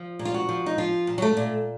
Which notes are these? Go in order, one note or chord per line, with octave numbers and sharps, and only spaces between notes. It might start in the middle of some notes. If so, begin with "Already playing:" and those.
Already playing: F3
A#2
F4
F#4
F3
D#4
F3 F4
A#2
F#3
A3
A#2